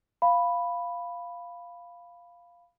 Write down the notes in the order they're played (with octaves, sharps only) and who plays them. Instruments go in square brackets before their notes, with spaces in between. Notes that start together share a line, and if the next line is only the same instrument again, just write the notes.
[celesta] F5 B5